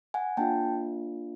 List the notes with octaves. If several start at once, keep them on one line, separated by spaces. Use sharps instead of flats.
F#5 G#5
A#3 D4 F4 G5 A5